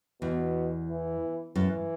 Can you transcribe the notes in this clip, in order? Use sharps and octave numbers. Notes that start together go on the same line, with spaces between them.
E2 B2
E3
F#2 E3